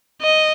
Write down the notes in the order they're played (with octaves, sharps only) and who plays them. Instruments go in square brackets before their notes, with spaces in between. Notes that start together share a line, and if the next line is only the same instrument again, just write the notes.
[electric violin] D#5